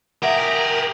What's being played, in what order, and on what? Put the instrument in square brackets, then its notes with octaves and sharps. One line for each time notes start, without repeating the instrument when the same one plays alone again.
[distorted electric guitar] G4 G#4 [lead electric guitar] A#4 [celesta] E5 F#5